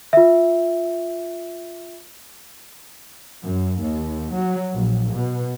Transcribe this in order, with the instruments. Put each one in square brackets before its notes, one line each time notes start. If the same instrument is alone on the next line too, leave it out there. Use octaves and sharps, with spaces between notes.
[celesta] F4 E5
[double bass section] F#2
D#2
F#3
A#1
B2